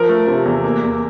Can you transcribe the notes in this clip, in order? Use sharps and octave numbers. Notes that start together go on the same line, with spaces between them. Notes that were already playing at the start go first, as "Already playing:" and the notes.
Already playing: F3 A#4
A3
C3
E2
A#3
E2